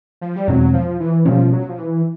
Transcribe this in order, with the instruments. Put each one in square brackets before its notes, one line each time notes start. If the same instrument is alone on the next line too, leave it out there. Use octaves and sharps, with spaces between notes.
[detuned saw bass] F3
G3
[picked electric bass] E2 B2 G#3 C4 [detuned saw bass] F#3
[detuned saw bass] F3
E3
[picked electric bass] B2 G3 A#3 C#4 [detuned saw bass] F3
[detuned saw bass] F#3
F3
E3